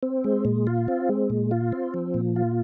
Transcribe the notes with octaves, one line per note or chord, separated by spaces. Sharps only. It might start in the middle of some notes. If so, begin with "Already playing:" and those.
C4
G#3
A#2
F4
C4
G#3
A#2
F4
C4
F3
A#2
F4